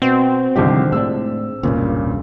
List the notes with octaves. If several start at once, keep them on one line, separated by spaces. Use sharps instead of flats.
B2 C4 F#4
C2 D3 D#3 F3 G#3 G4
A2 G#3 D4 E6
E1 C#2 G2 A#2 C#3